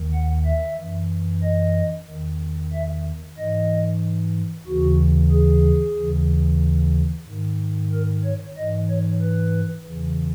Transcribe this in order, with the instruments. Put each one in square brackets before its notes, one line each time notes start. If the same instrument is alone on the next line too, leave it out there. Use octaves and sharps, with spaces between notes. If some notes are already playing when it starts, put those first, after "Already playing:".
Already playing: [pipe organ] D#2 D#3
F#5
E5
F#2 E3
D#5
E2 D#3
E5
G#2 E3 D#5
D#2 C#3 E3 F#4
G#4
D#2 C#3 E3
G#2 D#3
A#4
C#5
G#2 E3 D#5
C#5
B4
E2 C#3 E3